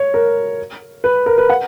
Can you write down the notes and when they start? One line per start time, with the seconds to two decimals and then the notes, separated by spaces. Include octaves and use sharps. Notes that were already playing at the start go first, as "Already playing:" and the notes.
Already playing: C#5
0.14 A#4
1.04 B4
1.26 A#4
1.38 B4
1.50 F#5